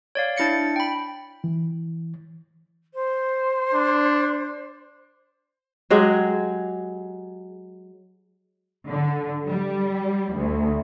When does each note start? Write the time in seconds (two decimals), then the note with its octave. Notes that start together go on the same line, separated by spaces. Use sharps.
0.15 C#5 D5 F5
0.36 D4 E4 A6 C#7 D7
0.76 G5 B5
1.44 E3
2.94 C5
3.73 D4
5.90 F#3 G#3 G4 G#4
8.88 D3
9.48 G3
10.35 D2